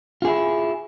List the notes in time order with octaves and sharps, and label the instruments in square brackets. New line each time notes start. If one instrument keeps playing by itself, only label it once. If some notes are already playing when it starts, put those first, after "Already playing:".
[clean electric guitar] F4
G#4
E4